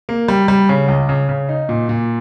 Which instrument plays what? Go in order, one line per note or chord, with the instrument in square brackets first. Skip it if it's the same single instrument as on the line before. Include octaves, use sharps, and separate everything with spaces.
[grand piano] A#3
G3
G3
C#3
C#2
C#3
C#3
D#4
A#2
A#2